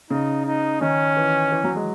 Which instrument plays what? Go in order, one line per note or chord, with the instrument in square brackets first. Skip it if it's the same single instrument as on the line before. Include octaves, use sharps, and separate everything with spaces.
[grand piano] C#3 [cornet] D#4
[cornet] D#4
[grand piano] D#3 [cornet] C#4
[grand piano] E3
E3
F#3
G#3